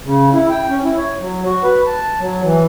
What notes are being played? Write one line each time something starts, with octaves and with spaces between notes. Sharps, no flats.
C#3
E4
G5
C#4
E4
C#5
F#3
F#4
B4
A5
F#3
E3